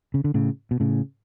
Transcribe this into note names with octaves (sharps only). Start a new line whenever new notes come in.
C#3
D3
A2 C#3
B2
A2 C#3